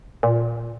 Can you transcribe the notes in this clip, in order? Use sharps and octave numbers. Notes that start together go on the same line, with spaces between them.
A#2